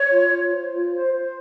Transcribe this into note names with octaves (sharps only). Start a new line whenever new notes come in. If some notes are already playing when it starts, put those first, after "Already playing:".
Already playing: C#5
F4
F4
C5
F4
C5
C5